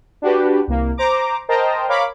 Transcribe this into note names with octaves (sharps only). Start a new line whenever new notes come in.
D4 F#4 G4 B4
C2 A#3
C5 A#5 D6
A#4 C5 D#5 G5 A5 A#5
A#4 C#5 F5 B5 D6